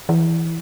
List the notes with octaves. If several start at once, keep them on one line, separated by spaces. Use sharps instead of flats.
E3